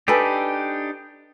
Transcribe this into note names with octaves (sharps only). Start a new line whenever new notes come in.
D4 D#4 G4 A4 B4 G#5